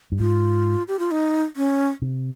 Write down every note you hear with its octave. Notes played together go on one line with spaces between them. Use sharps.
G2
G#2 F4
G4
F4
D#4
C#4
C3